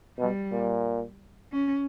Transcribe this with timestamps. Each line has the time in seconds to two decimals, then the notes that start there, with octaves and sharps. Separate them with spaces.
0.18 B2 G3
0.52 A#2
1.52 C#4